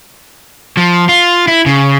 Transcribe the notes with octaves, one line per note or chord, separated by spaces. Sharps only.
F3
F4
E4
C#3